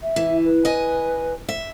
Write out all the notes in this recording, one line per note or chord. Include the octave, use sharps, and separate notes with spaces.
E5
E3
B4
D#5 G#5
E5